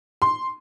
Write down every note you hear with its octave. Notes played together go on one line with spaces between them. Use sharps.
C6